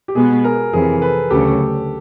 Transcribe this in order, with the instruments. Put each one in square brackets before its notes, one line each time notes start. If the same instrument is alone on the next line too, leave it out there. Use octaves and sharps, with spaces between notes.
[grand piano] G4
[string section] B2 G#3 B3 [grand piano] G#4
[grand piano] G#4 A#4
[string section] F2 C3 E3 [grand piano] G#4 A#4
[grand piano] A4 B4
[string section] D2 C#3 F#3 [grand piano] G4 A4